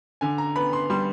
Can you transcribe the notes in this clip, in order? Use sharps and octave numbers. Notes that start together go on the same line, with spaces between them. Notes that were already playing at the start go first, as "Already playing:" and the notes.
D3 G#5
A#5
B3 B5
C6
G3 C6